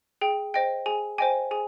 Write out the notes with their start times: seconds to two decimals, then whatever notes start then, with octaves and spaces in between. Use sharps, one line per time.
0.21 G#4 G5
0.54 C5 D#5 G5
0.86 G#4 G#5
1.18 C5 D#5 G5 G#5
1.51 G#4 G#5